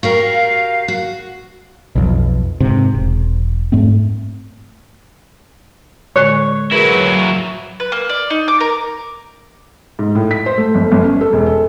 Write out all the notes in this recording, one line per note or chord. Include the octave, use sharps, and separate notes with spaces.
F#4 G4 A#4 F5
F#4
B1 F2
G#2 C3
E1
G#2 A3 C4
A2 D3 G#3 C#5
F#3 E4 G#4 A#4 B4
E5
B4
A#3
D5
D#4
D6
A#4
G#2
A2
B6
C5
A3
G1
G1
C#4
A4
E1
A4